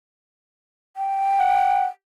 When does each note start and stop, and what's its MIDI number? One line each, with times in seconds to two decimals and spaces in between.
0.96 1.82 79
1.39 1.88 78